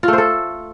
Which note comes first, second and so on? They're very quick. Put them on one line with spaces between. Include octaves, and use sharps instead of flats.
F4 A3 C5 A4